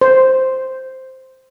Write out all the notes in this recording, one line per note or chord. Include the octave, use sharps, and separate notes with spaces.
C5